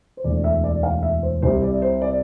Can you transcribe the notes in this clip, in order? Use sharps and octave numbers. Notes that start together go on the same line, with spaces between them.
C5
E1 D2 D3 D5
E5
D5
F5
E5
C5
C2 C3 G3 C4 C5
D5
C5
D5